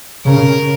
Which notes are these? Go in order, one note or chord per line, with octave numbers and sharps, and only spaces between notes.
C#3 A#4